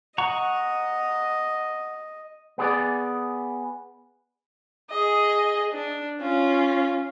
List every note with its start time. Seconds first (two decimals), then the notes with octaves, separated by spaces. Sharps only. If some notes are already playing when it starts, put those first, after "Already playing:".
0.18 D#5 F#5 A#5 C#6
2.58 B3 G#4 D5
4.90 G#4 D#5
5.73 D4
6.21 C#4 F4